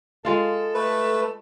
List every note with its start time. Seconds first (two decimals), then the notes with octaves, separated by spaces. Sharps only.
0.25 G#3 F4 A4 F5
0.74 A3 B4